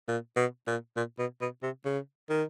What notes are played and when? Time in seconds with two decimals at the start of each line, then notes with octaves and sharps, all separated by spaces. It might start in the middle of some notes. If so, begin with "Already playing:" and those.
0.08 A#2
0.36 B2
0.67 A#2
0.96 A#2
1.19 B2
1.41 B2
1.63 C3
1.85 C#3
2.30 D#3